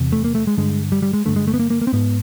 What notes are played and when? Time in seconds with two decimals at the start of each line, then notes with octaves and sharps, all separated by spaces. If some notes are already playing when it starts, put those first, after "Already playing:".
Already playing: E2 C3
0.12 A3
0.24 A#3
0.35 A3
0.47 G#3
0.57 G2 D3 G#3
0.92 G3
1.02 G3
1.13 G#3
1.25 G2 D3 A3
1.36 G#3
1.48 A3
1.54 B3
1.60 A#3
1.70 A#3
1.82 A#3
1.87 C4
1.93 G#2 B3